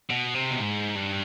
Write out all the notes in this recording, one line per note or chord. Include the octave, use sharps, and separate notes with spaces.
B2
C3
B2
G#2
G2